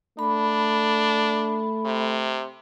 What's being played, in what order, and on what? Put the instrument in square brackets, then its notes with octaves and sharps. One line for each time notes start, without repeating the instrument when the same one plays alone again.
[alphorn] A3 [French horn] D4 [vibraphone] B5
[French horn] C3